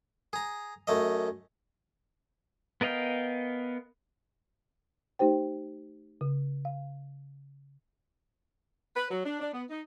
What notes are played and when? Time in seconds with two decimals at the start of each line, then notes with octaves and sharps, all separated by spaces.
0.33 G#4 A#5
0.87 F#2 A3 D#5
2.81 B3 A#4 D#5 F5 G5
5.19 A3 D#4 G4 C5 G5
6.21 C#3
6.65 F5
8.96 B4
9.10 F#3
9.25 D4
9.40 D4
9.53 B3
9.70 D#4